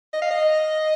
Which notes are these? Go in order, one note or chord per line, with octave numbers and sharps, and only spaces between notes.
D#5
F5
D#5